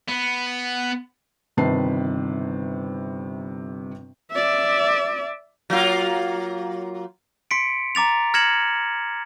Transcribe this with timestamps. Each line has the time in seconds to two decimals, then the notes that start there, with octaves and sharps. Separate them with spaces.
0.09 B3
1.57 G1 C3 D#3 B4 A5 C7
4.32 D5 E5
5.70 F#3 A#3 F4
7.51 C6 B6 C#7 D7
7.95 A#5 D6 A6 F7
8.34 F6 G#6 A#6 C#7 E7 F#7